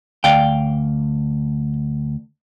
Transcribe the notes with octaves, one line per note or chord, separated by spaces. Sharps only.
D2 D5 F5 G5